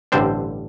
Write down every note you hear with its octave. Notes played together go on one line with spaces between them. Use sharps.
A1 G2 D3 G3 C4 D4 C5